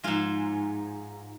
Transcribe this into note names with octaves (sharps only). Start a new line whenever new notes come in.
G#2 F3 G#3 F4